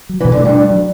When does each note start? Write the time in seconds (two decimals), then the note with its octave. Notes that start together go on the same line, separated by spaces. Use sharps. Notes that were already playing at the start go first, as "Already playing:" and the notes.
0.09 F#3
0.20 E3
0.24 B2
0.32 D3
0.40 G2 A3
0.55 D4
0.71 F#3